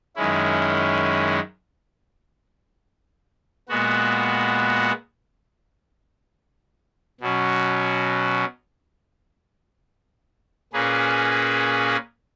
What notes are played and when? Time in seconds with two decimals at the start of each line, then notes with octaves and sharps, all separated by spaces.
0.16 F#2 D#3 G#3 C#4 E4
3.69 A#2 G#3 B3 F#4
7.21 B2 F#3 C#4
10.73 A#2 A#3 C#4 G#4 B4